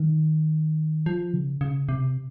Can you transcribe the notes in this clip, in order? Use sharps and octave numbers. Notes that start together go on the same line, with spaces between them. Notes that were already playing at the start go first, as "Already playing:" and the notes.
Already playing: D#3
F3
C#3
C#3
C3